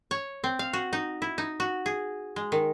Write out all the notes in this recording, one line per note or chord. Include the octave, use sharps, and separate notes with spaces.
C#5
C4
F5
F#4
D#4
E4
D#4
F#4
G#4
G#3
D#3